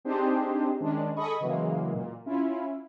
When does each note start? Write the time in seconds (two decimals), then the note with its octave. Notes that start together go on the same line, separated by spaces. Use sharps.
0.05 C4 D4 D#4 G4 G#4 C5
0.80 D#3 G#3 C#4 D4
1.16 G#4 A4 D#5 B5 C#6 D#6
1.40 C#3 E3 F#3 G#3 A#3
1.94 A#2
2.26 C#4 E4 F4